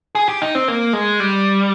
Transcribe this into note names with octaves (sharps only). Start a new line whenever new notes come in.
G#4
G4
D#4
C4
A#3
G#3
G3